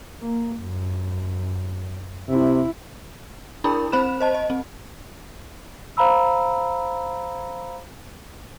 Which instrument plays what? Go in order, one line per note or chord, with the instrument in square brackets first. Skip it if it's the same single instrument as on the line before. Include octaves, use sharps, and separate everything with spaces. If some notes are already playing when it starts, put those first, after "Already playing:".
[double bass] A#3
F#2
[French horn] C3 [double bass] E4
[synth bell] D4 E4 G#4 A#4 B5
C4 C5 B5 F#6 E7
C5 D#5 A5
D#5
C4
[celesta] C5 F5 A#5 B5 E6